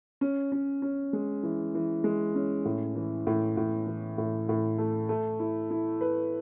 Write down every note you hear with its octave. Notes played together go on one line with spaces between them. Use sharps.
C#4
C#4
C#4
G#3
E3
E3
G#3
C#4
A2
E3
A2
A2
E3
A2
A2
A3
A3
E4
E4
B4